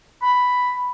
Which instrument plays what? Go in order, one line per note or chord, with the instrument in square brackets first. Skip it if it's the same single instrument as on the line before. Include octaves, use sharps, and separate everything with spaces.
[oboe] B5